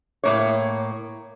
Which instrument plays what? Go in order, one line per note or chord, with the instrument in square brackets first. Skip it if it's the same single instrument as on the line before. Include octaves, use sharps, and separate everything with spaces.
[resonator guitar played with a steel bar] A2 A#3 C#5